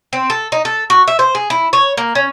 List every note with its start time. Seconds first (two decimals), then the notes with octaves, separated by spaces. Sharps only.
0.13 C4
0.30 A4
0.52 D#4
0.65 A4
0.90 F#4
1.08 E5
1.19 C5
1.35 G#4
1.50 E4
1.73 C#5
1.97 A#3
2.15 C#4